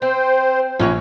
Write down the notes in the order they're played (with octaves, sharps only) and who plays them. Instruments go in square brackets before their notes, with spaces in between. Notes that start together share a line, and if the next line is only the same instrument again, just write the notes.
[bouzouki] C4 [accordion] C5
[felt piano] A#1 [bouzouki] F#3 B3 C#4